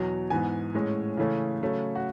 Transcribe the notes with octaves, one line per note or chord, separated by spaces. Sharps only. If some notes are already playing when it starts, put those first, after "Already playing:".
Already playing: E2 B2 F#3
G#2 E3 B3 G#5
A2 G#3 C#4
C#3 E3 A3 C#4
C#3 F#3 A3 C#4
F#4